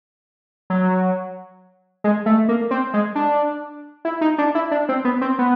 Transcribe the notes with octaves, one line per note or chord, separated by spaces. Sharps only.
F#3
G#3
A3
A#3
C4
G#3
D4
E4
D#4
D4
E4
D4
C4
B3
C4
B3